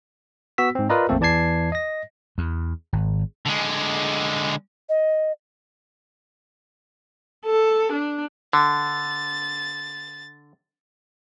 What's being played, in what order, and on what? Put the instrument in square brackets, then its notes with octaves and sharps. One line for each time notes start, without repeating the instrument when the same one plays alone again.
[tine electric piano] B3 F#4 E6 B6
G#2 C4
F4 A#4 B4 D5 D#5 A#5
A#1 F2 A3 A#3 C4 A4
E2 E3 D5 A5 G#6 C7
D#5 A#6
[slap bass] E2
G#1
[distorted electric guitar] D3 G#3
[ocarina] D#5
[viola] A4
D4
[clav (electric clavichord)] D3 [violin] A6